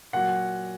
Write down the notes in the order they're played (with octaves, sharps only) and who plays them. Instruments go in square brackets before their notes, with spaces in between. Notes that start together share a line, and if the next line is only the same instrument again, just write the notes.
[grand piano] A#2 F#3 F#5